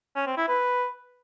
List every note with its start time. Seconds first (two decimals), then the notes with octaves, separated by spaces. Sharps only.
0.16 C#4
0.27 C4
0.37 E4
0.48 B4